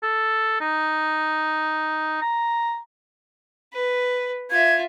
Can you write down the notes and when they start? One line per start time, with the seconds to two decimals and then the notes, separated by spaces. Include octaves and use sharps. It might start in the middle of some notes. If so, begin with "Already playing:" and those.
0.03 A4
0.61 D#4
2.22 A#5
3.73 B4
4.51 F4 E5 G#6